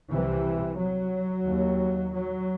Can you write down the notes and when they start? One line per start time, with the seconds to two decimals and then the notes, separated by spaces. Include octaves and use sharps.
0.11 C2 C3 E3
0.78 F#3
1.46 D#2
2.13 F#3